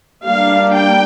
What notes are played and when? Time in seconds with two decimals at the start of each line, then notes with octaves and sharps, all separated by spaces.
0.24 G3 A#3 D4 F5
0.72 G5